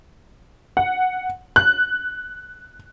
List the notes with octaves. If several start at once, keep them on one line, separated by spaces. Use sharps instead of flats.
F#5
F#6